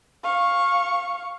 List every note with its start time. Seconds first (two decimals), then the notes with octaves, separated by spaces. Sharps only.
0.24 F5 C#6